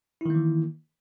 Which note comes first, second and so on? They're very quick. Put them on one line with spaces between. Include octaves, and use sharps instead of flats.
E4 D#3 A#3 E3